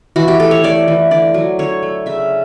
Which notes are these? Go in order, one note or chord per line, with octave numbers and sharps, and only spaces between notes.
E3 F#4
G4
A3 A4
C#5
A3 D5
E3
D3 D5
F#3
D3 C#5
A3
C#3 E5